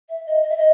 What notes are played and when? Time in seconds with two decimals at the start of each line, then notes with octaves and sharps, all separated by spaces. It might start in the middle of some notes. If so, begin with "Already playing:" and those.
0.09 E5
0.26 D#5
0.42 D#5
0.49 E5
0.57 D#5